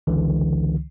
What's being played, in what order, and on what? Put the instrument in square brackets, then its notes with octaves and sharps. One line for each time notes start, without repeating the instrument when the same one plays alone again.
[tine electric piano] C#2 D3 E3